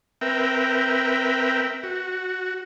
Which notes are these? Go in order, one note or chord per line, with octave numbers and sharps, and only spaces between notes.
C4 A#4 B4 E5 G5
F#4